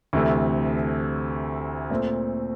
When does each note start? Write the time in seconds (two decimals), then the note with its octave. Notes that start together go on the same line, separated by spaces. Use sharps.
0.13 D2 C3 E3 A3
1.90 A#2 A3 C4